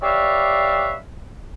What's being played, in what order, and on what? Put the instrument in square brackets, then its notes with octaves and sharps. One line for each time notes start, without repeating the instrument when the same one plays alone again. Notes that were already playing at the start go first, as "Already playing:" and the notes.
[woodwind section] G4 B4 C#5 D5 E5 F5